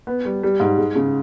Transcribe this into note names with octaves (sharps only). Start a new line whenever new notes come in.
B3
G3
G3
G#2
G#3
C#3